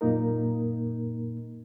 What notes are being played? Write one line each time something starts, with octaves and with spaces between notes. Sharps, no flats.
F#2 A#2 A#3 D#4 A#4